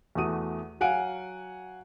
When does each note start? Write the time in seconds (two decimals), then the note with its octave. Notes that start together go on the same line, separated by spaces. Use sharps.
0.15 E2 A3 F#4 D#6 D#7
0.80 F#3 F5 F#5 G#5 D7